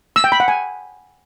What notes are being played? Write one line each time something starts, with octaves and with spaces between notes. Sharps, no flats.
E6
G5
B5
F#5
G#5